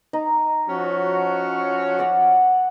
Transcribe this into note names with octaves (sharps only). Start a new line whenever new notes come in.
D#4
F3 C#4 F#4
D5 F#5